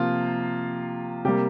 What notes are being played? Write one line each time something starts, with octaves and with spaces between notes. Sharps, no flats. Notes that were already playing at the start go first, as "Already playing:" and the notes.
Already playing: C3 F3 A#3 F4
C3 G3 A#3 G4